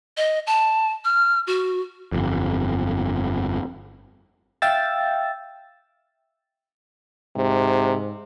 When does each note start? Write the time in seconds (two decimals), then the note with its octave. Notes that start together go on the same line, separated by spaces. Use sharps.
0.17 D#5
0.47 A5
1.05 F6
1.47 F#4
2.12 G1 F2
4.62 E5 F5 G5 E6 A6
7.36 G#2 C3